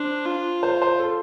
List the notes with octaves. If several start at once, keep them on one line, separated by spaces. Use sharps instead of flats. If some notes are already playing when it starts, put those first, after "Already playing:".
Already playing: D4 C5
F4
C5
C5
A4